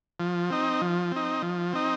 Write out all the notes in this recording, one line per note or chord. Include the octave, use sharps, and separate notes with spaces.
F3
C4 D#4
F3
C4 D#4
F3
C4 D#4